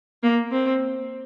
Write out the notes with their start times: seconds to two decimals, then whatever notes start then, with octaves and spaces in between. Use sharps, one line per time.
0.23 A#3
0.51 C4